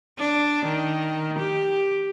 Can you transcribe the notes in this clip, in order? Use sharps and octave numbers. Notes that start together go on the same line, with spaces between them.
D4
D#3
G4